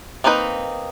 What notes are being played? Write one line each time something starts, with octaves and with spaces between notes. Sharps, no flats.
A#3 C4 D4 D#4 B4